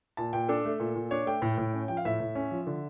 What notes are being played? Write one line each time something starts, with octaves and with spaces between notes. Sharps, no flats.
A#2 A5
A#2 G5
D4 A4
A3
A#2
A#2
D4 C#5
A3 G5
A2
A2
C#4
F3 G5
F5
A2 E5
A2
C#4
F3
D3